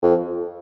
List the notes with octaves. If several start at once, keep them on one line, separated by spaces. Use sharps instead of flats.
F2